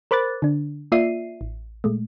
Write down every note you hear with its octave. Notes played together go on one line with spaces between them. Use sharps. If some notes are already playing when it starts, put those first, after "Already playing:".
A#4 C5 B5 D6 F#6 A6
D3 D4
A#3 F4 D5 E5 C7 D#7
A1
A#2 G#3 A3